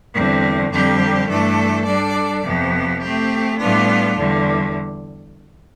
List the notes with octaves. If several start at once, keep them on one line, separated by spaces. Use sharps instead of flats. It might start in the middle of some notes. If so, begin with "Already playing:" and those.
E2 D3 G3 C4
F2 D3 G3 C4 G4
G2 E3 A3 D4 A4
G3 D4 A4 D5
F2 C3 F3 B3
A3 C4 G4
A2 G3 B3 D4 F4
E2 D3 G3